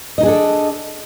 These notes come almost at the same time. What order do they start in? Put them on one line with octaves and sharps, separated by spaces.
D#5 D#4 G#4 D4 A4